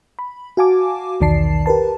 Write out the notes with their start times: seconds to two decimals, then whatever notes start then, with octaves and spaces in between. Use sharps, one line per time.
0.19 B5
0.57 F#4 F5 G#5 A5 D6
1.21 B1 E2 D#3 D5 A5 C7
1.66 G4 A#4 B4 A5